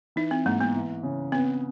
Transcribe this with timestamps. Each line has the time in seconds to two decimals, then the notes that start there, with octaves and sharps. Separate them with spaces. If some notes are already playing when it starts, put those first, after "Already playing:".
0.16 E3 D#4
0.31 C4
0.46 G#2 A#3
0.61 B3
0.75 E3
1.03 C#3
1.32 B3 C4